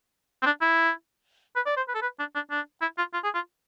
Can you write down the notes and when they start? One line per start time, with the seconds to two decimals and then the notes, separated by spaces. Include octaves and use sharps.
0.42 C4
0.46 D4
0.62 E4
1.56 B4
1.67 D5
1.77 C5
1.88 B4
1.95 A4
2.02 B4
2.19 D4
2.35 D4
2.51 D4
2.82 E4
2.98 F4
3.14 F4
3.24 G#4
3.35 F4